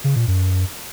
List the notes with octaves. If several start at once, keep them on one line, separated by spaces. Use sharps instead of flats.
C#3
A#2
F#2